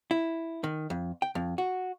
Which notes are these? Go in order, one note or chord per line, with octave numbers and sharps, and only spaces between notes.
E4
D#3
F2
G5
F2
F#4